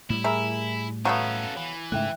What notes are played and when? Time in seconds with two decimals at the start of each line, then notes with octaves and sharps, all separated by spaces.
0.10 A2 G3 E4
0.24 G#4 A#4 E5 G#5 B5
1.05 F#3 A3 B3 C#4 A4 F5 F#6
1.56 E3
1.92 G#2 C#3 A3 E5 G5 F#6